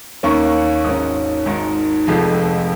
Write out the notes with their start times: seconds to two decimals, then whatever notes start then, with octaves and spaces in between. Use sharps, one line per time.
0.23 D#2 D#3 A#3 C#4 C#6
0.84 G#1 G#2 D#3 C#4 D#6
1.46 G#1 G#2 D#3
2.07 F1 F2 F3 G#3